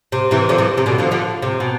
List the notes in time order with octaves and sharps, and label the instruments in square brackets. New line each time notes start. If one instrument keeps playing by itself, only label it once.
[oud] C3
C3 E3
D3 F3
C3 E3
C3
B2 D3
D3 F3
D3 F3
C3
B2